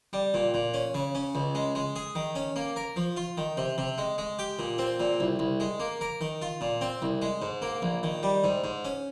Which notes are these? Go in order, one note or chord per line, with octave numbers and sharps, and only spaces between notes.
G3
A#2
A#2
C#4
C#3
C#4
C#2
G#3
G#3
G#4
D#3
C#4
A#3
A#4
F3
F4
D#3
C3
C3
G#3
G#3
G4
A#2
C4
A#2
C2
C2
G#3
A#3
A#4
D#3
F4
A#2
C4
C2
G#3
G#2
A#3
A#1
D#3
G3
G#2
G#2
C#4